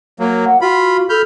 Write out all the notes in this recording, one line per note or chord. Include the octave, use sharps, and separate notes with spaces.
F#3 A#3
F#5
F4 F#4 B5
A4 B5 F6 G6